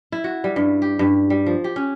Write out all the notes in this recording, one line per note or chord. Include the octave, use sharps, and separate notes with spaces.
E4
F#4
G3
G2
G4
G2
G3
F3
G4
C#4